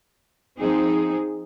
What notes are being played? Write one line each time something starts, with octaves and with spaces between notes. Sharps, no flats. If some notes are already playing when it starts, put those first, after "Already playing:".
F3 C4 D#4 G#4